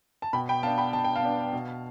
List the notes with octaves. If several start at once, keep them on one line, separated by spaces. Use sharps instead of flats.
A5
B2 G5 B5
G5 B5
B3 D4 F5 A5
G5 B5
B2 A5
G5
F5 A5
B3 D4
B2